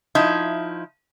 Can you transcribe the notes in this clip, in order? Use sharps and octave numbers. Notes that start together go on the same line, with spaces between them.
F3 D#4 E4